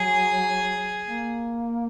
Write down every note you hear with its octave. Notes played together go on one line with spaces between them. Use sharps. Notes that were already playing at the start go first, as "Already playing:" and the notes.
Already playing: F#3 G#4
A#3